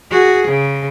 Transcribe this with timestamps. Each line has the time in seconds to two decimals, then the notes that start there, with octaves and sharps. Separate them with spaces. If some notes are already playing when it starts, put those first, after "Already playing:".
0.11 F#4 G#4
0.49 C#3